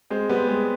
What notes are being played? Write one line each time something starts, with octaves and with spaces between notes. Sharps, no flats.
G#3 C4
G3 B3
G#3